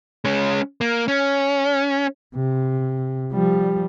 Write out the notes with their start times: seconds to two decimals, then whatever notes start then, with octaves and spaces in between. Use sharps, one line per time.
0.25 G#3 C#4
0.81 A#3
1.08 C#4
2.35 C3
3.32 F3 G3